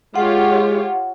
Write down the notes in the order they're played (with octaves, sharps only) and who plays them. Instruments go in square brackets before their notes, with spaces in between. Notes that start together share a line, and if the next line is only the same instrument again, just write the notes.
[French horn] G#3 [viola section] F4 G4 C#5 [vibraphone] F#5